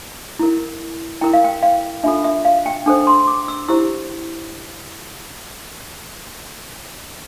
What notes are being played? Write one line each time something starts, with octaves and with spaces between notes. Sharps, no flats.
E4 A#4
E4 A#4 G5
F5
G5
F5
D4 F4 A4 E5
E5
F5
G5
D4 A4 C5
C6
D6
E6
E4 G4 C5 E6